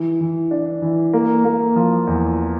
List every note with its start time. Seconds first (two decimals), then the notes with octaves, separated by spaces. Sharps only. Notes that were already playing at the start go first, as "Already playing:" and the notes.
Already playing: E3
0.20 E3
0.51 D4
0.82 E3
1.13 A#3
1.44 A#3
1.76 F3
2.07 E2